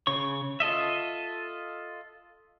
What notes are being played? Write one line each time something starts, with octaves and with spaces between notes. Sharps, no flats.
C#3 C#5 C#6
F4 A4 D#5 E5